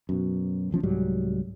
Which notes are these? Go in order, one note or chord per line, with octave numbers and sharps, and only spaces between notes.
F#2 B2
D1 A1 F3 C#4
C2 G#2 F#3 G3